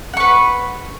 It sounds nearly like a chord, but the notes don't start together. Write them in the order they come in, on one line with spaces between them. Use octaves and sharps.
F#5 C#6 B4